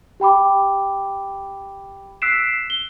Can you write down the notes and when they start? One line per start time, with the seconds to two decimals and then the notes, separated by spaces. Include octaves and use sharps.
0.20 G4 G5 B5 D6
2.22 E6 F#6 B6 C7 D7 E7
2.70 G7